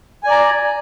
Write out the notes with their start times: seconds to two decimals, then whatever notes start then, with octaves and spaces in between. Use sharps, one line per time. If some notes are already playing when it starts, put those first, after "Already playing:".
0.24 G#5
0.27 D5
0.31 A#5